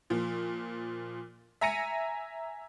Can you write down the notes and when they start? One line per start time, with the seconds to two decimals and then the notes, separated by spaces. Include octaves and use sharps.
0.10 A#2 F3
1.61 E5 G#5 A#5 A#6 C#7 D#7